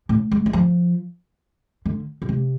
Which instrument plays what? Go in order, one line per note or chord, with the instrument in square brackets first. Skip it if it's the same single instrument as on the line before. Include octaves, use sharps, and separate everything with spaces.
[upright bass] A2
G#3
G#3
F3
D3
B2
C3